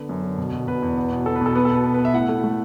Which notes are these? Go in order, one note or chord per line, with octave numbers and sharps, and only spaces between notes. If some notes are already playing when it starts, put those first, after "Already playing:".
Already playing: D3 B3
F#2
D3
B2
B2
B2 B4
E2
B3
B2
B3 A4
B4
B2 A4
B3 B4
A4
B2
B4
B3
B4
B3
E5
A2 F#5
A3
A3